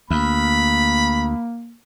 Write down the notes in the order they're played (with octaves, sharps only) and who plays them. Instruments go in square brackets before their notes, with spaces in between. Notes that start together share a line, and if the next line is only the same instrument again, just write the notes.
[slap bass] D2 [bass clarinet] A#3 [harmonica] B5